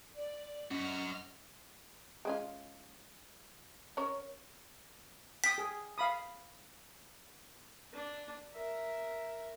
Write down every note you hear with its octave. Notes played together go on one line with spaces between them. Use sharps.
D5
F#2 C#4 F#4 D#5 F6
G#3 C#4 F4
C#4 A#4 C#5
G5 D#6 B6
G#4
F5 B5 D#6
D4
A#4 E5